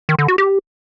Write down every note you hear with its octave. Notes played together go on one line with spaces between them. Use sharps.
D#3
D3
F#4
G4